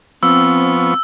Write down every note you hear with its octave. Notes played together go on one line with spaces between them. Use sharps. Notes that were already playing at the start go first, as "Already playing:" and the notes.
F3 B3 C4 C#6 E6